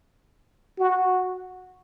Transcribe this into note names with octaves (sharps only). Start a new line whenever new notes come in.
F#4